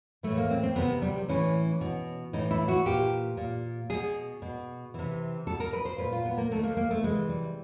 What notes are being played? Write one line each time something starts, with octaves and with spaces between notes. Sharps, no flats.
A2 E3 A3
A#3
C4
C4
C3 D#3 B3
G3
A2 E3 C#4
B2
A2 E3 D#4
E4
F#4
A#2 G4
A#2
B2 G#4
B2
C3 E3
B2 A4
A#4
B4
C5
A#2 B4
F4
B3
A#3
C3 D#3 A3
A#3
A#3
A3
C3 E3 G#3
G3